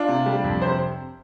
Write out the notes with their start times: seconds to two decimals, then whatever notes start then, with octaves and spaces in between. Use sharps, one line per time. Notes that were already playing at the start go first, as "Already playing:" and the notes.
Already playing: D4 F4
0.08 C3
0.26 G3
0.44 F2
0.61 C3 C5